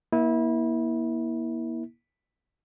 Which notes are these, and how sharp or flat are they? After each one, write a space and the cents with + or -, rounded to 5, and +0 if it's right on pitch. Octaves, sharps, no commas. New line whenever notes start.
A#3 +35 E4 -25